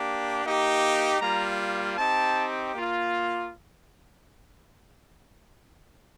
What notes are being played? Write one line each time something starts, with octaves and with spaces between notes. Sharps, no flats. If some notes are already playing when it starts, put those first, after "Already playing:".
Already playing: A#3 D4 G4
A#3 D#4 G4
G3 A#3 F4 A#5
C4 D#4 G4 A5
A#3 F4